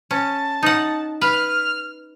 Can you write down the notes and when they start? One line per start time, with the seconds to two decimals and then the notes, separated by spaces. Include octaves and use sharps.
0.11 C#4 A5
0.63 D#4 F#5
1.21 B4 F6